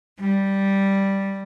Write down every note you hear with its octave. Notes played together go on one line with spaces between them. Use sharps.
G3